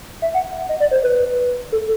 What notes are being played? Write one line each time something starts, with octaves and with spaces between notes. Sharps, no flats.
E5
F#5
D#5
D5
C5
B4
A4